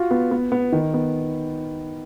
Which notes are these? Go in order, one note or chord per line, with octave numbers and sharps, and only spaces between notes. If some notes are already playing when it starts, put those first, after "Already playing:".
Already playing: F4 F#4
B3
B3
B3
D#3
B3